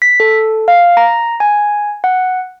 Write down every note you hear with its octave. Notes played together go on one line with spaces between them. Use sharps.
B6
A4
F5
A#5
G#5
F#5